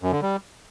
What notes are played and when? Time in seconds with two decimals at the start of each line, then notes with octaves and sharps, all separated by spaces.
0.01 F#2
0.12 D3
0.22 G3